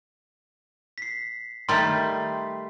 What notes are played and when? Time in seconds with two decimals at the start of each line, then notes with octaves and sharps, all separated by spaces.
0.98 B6 C7
1.69 D#3 G3 A3 C6